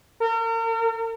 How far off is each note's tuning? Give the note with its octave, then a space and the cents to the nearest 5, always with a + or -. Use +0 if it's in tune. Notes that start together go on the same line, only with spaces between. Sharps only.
A#4 -40